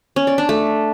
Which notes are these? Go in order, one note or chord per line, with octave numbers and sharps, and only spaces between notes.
C#4
D5
D4
A3